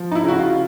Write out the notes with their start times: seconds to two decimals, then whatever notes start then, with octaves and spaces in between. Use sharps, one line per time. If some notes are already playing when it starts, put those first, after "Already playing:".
Already playing: F3
0.12 D#4
0.15 E4
0.23 C#3
0.28 F#4
0.39 F4